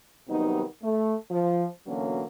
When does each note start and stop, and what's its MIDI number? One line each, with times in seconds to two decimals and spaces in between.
0.28 0.63 48
0.28 0.63 51
0.28 0.63 54
0.28 0.63 55
0.28 0.63 59
0.28 0.63 63
0.83 1.14 57
1.31 1.66 53
1.86 2.23 47
1.86 2.23 50
1.86 2.23 52
1.86 2.23 54
1.86 2.23 58
1.86 2.23 61